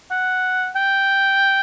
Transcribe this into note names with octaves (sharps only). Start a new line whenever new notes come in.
F#5
G5